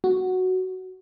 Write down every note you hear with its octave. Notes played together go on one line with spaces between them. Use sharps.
F#4